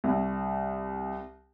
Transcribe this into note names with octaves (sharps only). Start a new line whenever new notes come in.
C2